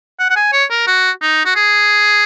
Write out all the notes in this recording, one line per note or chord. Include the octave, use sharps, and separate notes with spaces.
F#5
F#5
G#5
C#5
A#4
F#4
D#4
F#4
G#4